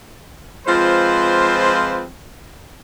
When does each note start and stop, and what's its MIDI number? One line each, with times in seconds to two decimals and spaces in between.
0.67 2.05 53
0.67 2.05 56
0.67 2.05 60
0.67 2.05 65
0.67 2.05 71
0.67 2.05 72